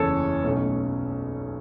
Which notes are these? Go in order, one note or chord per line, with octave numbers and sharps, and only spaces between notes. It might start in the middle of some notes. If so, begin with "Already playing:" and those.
Already playing: F#1 E2 C#3 E3 C#4 A4 C#5
B1 B2 A3 C#4